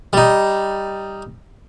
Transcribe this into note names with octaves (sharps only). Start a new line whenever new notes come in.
G3 D#4